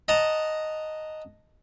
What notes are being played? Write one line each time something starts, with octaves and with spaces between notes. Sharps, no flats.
D#5 F#5 A5 A#5